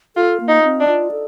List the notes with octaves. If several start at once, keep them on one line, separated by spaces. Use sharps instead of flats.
F4 A4
A#3
D#4
C4
D4
F4
A4